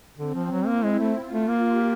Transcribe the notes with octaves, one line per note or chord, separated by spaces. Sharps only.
D3 C4
F3
F#3
A#3 E4
G#3
A3
F4
A3
A#3
G4